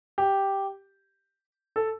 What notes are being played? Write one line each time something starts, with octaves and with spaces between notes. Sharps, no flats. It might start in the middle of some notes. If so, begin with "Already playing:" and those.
G4
A4